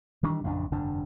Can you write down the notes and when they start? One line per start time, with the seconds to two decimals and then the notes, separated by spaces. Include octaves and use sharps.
0.23 D#3 E3 G3 D4
0.44 A1 F2 C#3 D4
0.71 F1 G2 D3 D4